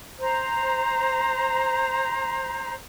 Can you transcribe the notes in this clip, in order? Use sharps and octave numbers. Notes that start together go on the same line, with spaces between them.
C5 A#5